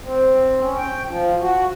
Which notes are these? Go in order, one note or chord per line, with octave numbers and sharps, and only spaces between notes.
C4
C#4
G5
F3
F#4